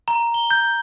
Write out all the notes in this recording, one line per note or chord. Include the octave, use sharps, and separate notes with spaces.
A#5
G7
G6